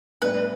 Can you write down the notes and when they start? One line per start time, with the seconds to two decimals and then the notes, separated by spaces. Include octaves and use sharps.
0.22 A2 G3 D4 G4 B4 D5